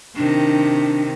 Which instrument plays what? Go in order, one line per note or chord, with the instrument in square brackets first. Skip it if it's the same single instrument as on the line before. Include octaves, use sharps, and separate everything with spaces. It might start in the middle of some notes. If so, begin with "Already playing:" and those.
[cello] C3 D#3 [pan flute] D4